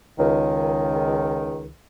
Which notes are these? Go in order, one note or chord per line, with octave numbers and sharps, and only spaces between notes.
C#2 D#3